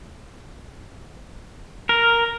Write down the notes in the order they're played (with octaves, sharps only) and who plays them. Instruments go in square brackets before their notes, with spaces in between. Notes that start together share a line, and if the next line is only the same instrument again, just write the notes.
[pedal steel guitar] A#4